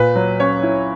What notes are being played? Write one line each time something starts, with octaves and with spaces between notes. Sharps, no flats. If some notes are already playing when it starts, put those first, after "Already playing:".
Already playing: A#2 B4
F#3
C#4 C#5
E4